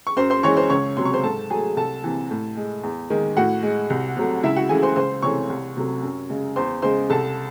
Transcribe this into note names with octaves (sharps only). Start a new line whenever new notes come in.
C#6
F#2 C5 C6
C5 C6
E3 G#3 C#5 C#6
C5 C6
C#2 C#5 C#6
C3 F#3 C6
C#6
C5 C6
G#2 A4 A5
F#3 A3 G#4 G#5
C2 A4 A5
C3 E3
A2
G#3
E2
D#3 G#3
A2 F#4 F#5
G#3
C2
C3 F#3 A3
C#2 E4 E5
F#4 F#5
C#3 E3 A3 G#4 G#5
C5 C6
C#2 C5 C6
C3 E3 A3 C#5 C#6
C2
C3 F#3 A3
F#2
C#3 G#3
E2 C5 C6
C#3 G#3 C5 C6
C2 A4 A5